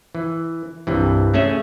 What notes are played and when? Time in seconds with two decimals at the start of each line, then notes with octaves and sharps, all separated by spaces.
0.15 E3
0.87 C2 G2 E3
1.33 A3 C#4 G#4 E5